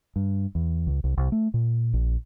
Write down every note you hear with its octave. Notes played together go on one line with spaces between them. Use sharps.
G2
E2
C#2
C2
C2
A3
A#2
A#1